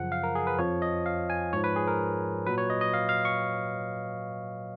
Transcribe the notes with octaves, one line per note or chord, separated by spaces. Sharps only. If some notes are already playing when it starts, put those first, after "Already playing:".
Already playing: F#2 C#3 F3 F#5
F5
A#4
G#4
B4
F2 F3 C#5
D#5
F5
G#5
G#2 F3 C#5
B4
G#4
A#4
A#2 F#3 B4
C#5
D#5
D#5
F5
F5
C#6